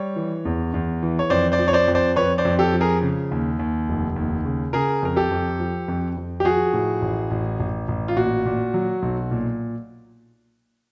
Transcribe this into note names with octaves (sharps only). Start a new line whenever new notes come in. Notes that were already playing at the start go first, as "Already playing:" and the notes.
Already playing: G3 C#5
E3
E2
E2
E3
C#5
F2 C5 D5
C5 D5
F3
C#5
C5 D5
F2
C5 D5
F2 B4 C#5
C5 D5
F2
G4 A4
F3
G#4 A#4
C#3
D#2
D#2
F1
D#2
C#3
C#3 G#4 A#4
F2 A#4
G4 A4
F2
F3
F2
F2
G4
F3 F#4 G#4
A2
A1
A1
A1
A1
F4
A#2 F#4
A#2
F#3
B1
A#2